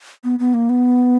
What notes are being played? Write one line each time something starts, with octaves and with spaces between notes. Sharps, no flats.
B3
B3
A#3
B3